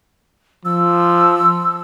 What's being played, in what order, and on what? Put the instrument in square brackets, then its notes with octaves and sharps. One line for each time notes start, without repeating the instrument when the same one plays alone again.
[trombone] F3 [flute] E6